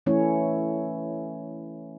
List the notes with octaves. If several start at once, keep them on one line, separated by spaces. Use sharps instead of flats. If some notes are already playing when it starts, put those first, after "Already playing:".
E3 A3 C#4 E4 C#5